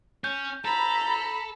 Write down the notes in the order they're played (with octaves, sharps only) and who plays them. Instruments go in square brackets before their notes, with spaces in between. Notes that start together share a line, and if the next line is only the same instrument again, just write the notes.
[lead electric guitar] C#4 [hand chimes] G6
[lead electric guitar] A4 [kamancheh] A#5 [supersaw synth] B5